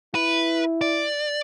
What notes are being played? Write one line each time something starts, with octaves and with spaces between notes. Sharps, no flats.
E4 B4
D5